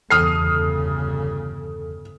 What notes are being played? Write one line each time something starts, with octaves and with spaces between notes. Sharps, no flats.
G1 E2 C#3 A4 D#6 F6 C7